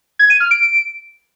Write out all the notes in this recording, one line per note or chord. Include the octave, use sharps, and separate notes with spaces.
G#6
D#7
F6
D7